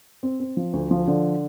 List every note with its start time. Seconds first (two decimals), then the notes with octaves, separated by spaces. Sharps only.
0.23 C4
0.40 C4
0.57 F3
0.73 D2
0.91 F3
1.07 D3